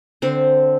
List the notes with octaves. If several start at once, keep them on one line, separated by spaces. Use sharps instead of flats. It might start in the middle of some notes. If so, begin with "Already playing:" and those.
D3 C4 C5